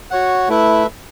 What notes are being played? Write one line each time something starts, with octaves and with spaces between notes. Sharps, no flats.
F#4 C#5 F#5
A3 E4 B4 E5